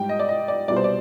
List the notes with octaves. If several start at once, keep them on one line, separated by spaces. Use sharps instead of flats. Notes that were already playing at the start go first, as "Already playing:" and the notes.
Already playing: G#2 G3 G5
D#5
D5
D#5
D5
C2 B2 G3 D5
C5
D5